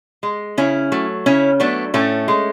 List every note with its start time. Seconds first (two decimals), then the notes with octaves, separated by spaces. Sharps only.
0.23 G#3
0.57 C#3 C#4 E4
0.92 F#3 A3
1.26 C#3 C#4 E4
1.60 F#3 A3 B3 D4
1.94 A2 A3 C#4
2.28 G#3